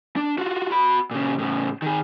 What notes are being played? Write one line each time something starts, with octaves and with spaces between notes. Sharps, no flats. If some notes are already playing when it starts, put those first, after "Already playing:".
D4
F4 F#4
F#4 B5
A#2 C#3
A2 C#3
D#3 G#4